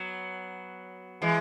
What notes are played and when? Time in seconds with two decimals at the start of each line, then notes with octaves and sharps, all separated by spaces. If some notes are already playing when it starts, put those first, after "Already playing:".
Already playing: F#3 B3
1.22 E3 G#3